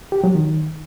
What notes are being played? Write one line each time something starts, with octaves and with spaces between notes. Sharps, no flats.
G4
F#3
D#3